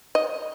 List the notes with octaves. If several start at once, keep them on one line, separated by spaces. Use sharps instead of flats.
D#5